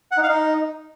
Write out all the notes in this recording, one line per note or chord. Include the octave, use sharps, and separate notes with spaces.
F#5
D#4
F5
D#4